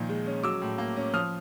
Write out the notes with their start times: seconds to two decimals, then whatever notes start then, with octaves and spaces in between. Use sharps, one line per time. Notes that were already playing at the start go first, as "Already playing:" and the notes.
Already playing: A#2 D#3 F3
0.09 G#3
0.26 C#4
0.43 F#3 D6 E6
0.62 A2
0.78 A#3
0.96 C#4
1.14 F3 D#6 F6